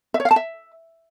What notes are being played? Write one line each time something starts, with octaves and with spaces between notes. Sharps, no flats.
E5
C#5
F5
A5
E5